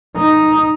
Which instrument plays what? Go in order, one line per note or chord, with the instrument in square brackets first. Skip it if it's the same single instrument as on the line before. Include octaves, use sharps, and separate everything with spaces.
[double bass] D#4